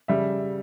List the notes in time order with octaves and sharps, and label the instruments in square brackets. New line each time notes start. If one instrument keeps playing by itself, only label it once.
[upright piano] C#3 G3 E5